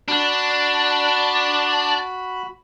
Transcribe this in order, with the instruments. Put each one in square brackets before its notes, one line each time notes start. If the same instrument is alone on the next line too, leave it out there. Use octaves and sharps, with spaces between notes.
[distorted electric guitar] D4 [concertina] F#4 B5